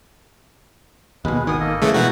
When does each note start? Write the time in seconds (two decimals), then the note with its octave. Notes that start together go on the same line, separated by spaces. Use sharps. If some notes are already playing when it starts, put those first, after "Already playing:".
1.25 D#2 B2 G#3 B4
1.47 G#1 D#3 B3 G#5 D#6
1.60 A#3 A4 D#5
1.82 C#3 E3 G#3 A3
1.94 B2 E3 D#4 F#4